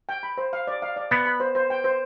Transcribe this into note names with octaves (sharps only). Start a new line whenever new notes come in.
G5
B5
C5
F5
D5
F5
D5
B3 B5
B5
C5
C5
G5
C5